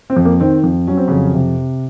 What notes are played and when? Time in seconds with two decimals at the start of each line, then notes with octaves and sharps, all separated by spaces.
0.10 C4
0.16 F2
0.25 A#3
0.41 D#3 C4
0.63 F2
0.88 F#3 C#4
0.97 C4
1.07 F2 C#3 C#4
1.34 C3